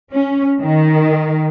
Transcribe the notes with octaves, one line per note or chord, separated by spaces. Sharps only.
C#4
D#3